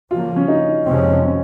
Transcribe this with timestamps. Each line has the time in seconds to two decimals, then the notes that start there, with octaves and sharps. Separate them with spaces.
0.10 C#3 F3 A#3 F4
0.36 C#4
0.48 D#4
0.86 F2 C3 F3 G#3 C4 C#4
1.24 C#4